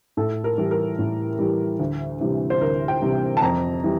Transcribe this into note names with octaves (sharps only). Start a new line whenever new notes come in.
A2 A4
A#4
E3 G3
A#4
A2
E3 G3
D2
C3 E3 G3
C5
D2 A#4
G5
C3 E3 G3
A5
F2 A#5
E3 G3